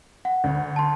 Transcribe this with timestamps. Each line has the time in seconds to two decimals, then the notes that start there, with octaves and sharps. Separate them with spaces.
0.25 F#5
0.44 D2
0.76 A5 C6